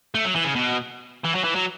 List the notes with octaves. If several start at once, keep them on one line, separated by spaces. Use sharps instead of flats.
A3
F#3
E3
C#3
B2
E3
F#3
E3
F#3